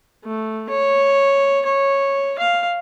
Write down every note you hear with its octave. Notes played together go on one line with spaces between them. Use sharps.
A3
C#5
C#5
F5